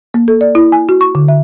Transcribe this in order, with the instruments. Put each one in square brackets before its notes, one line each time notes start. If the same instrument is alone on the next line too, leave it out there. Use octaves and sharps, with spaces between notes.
[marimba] A#3
A4
D5
E4
G#5
F#4
C#6
D3
E5